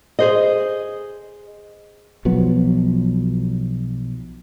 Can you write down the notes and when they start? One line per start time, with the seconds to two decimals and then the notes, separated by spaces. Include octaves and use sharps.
0.19 G#4 C5 D#5
2.25 B1 F3 F#3 B3